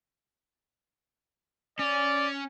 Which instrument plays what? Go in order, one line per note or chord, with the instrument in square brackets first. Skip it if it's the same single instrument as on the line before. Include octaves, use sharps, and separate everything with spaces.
[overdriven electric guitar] C#4 [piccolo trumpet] D5